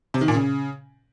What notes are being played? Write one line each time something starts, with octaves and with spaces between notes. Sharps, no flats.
C3
D#3
A#2
C#3